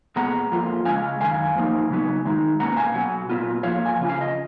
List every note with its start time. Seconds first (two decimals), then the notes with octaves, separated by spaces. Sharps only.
0.16 A#2 G#3 B3 F#5 A#5
0.51 F2 F3 A#3 F4
0.85 C#3 G#3 C#4 F5 G#5
1.20 F#2 D#3 F5 G#5
1.55 G#2 F3 A#3 D#4
1.90 C#3 F#3 B3 D#4
2.25 D#3 G#3 D#4
2.60 B2 A#3 C#4 F#5 A#5
2.76 F5 G#5
2.94 B2 F#3 B3 F#5
3.29 A#2 F#3 B3 F4
3.63 F2 F3 A#3 C#5 F5
3.86 G#5
3.98 F2 C#3 C#4 F4
4.09 F5
4.21 D#5